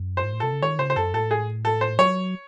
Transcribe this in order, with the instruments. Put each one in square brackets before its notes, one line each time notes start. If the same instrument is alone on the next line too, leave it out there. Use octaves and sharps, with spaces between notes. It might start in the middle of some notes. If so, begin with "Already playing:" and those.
Already playing: [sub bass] F#2
[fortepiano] C5
[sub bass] G#2
A2
[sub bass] C3 [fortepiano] A4
[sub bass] C#3
[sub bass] D#3 [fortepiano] C#5
[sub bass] C#3 [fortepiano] C5
[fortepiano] C5
[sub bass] F#2 [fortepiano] A4
[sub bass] A2 [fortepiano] A4
[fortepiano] G#4
A4
C5
[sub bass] F#3 [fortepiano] C#5